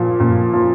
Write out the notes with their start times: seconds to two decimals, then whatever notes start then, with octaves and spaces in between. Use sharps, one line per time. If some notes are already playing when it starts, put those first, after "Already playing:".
Already playing: A#2 F3
0.20 A#2
0.53 F3